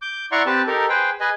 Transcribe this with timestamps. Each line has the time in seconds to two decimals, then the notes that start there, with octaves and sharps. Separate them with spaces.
0.02 D6 G6
0.32 E4 D5 F#5 A#5 C6 C#6
0.46 C4 G4 B4 A5
0.67 D#4 G4 A4 A#4
0.89 G#4 B4 C5 G5
1.20 G#4 B4 D#5 G#5